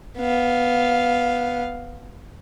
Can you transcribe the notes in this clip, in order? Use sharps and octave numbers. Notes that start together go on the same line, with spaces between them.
B3 F5